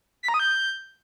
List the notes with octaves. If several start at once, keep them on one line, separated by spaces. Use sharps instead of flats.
B6
A#5
D#6
G6